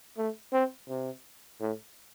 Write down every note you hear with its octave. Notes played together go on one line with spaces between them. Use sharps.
A3
C4
C3
A2